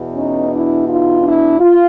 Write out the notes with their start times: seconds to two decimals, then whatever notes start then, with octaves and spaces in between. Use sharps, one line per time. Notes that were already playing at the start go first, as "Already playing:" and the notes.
Already playing: E2 B2
0.14 C#4 D#4
0.50 D4 E4
0.86 D#4 F4
1.23 D4 E4
1.58 F4